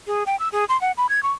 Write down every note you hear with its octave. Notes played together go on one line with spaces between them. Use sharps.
G#4
G5
E6
G#4
C6
F#5
B5
G#6
C#6